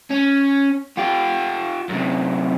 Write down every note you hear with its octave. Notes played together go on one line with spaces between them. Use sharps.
C#4
F4 G4
F#2 C3